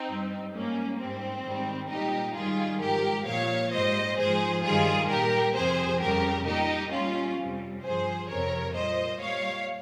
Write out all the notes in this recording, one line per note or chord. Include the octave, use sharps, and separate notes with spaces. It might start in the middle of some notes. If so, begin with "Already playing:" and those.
Already playing: C4 D#4
G2 G3
G#2 G3 A#3 C#4
G#2 G3 C4
G#2 D#3 G3
A#2 G3 D#4 G4
G#2 D#3 G3 F4 G#4
G#2 F3 G4 A#4
A#2 F3 C#5 F5
G#2 G3 C5 D#5
G#2 F3 G#4 C5
G2 D#3 G3 F4 G#4
A#2 G3 G4 A#4
F2 C3 F3 G#4 C5
F2 C#3 G3 G4 A#4
A#2 G3 D#4 G4
A#2 G3 C#4 F4
F2 C3 G3
G2 F3 G#4 C5
F2 C3 F3 A#4 C#5
A#2 G3 C5 D#5
A#2 G3 C#5 F5